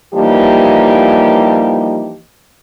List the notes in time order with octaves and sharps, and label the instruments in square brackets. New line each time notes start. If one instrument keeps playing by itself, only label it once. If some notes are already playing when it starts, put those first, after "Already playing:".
[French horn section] E3 F3 G3 A#3 D#4 G4